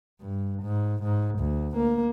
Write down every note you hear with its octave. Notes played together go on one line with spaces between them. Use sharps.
G2
G#2
G#2
D2
A#3